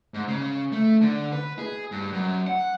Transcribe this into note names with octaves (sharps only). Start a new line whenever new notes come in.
G#2
C#3
A3
D3
B4
G#4
G2
F#2
F#5